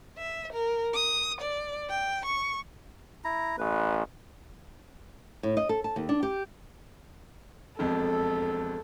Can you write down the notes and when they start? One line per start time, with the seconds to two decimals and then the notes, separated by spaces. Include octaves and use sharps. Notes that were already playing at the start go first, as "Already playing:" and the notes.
0.18 E5
0.53 A#4
0.94 D#6
1.41 D5
1.89 G5
2.26 C#6
3.24 E4 A#5
3.58 A1 B4
5.43 A2
5.57 D#5
5.69 A4
5.84 A5
5.96 D#2
6.09 D4
6.23 G4
7.79 E1 F2 A4